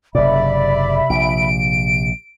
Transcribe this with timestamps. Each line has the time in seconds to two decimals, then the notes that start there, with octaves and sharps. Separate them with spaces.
0.15 F#1 G#2 C3 D5 E5 B5
1.10 A#1 D7